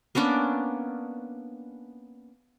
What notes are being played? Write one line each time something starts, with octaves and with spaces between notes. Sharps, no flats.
A#3 B3 C#4 D4